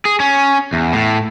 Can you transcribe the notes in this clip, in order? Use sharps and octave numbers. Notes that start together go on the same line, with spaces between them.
G#4
C#4
E2
A2